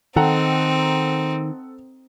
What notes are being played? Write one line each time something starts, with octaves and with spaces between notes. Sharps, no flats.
D#3 C4 D#4 A4 F#5 A#5